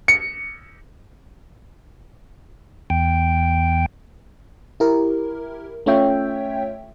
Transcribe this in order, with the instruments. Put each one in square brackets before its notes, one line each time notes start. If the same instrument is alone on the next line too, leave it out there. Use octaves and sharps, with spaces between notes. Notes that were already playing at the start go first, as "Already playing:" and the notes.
[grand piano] C#7
[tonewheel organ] E2 G5
[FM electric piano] E4 G4 A#4
A3 C#4 F4 C#5 E5 G5